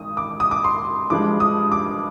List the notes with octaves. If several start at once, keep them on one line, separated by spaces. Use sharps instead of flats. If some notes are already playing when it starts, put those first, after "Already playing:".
Already playing: G#1 G#2 D#6
D6
D#6
D6
C6
G2 F3 G#3 D6
D#6
D6